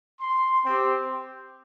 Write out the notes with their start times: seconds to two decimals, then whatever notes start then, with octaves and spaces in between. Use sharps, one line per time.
0.21 C6
0.65 C4 G4